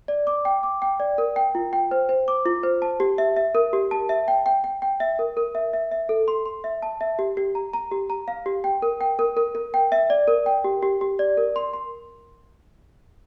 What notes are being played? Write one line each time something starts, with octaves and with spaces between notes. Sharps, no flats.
D5
D6
G5
D6
G5
D5
A#4
G5
F4
G5
C5
C5
D6
F4
C5
A5
G4
E5
E5
A#4
G4
A5
E5
G5
G5
G5
G5
E5
A#4
A#4
E5
E5
E5
A4
C6
C6
E5
A5
E5
G4
G4
A#5
A#5
G4
A#5
F5
G4
G5
A#4
G5
A#4
A#4
A#4
G5
E5
D5
A#4
G5
G4
G4
G4
D5
A#4
C6
C6